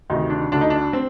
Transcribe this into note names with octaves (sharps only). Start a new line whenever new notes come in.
D2 C3 D#3 D#4
D4
D2 D3 D4
D#4
D4
C4